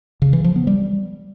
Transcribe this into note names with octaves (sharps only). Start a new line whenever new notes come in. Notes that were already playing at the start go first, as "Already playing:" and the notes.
C#3
E3
F3
B3
G3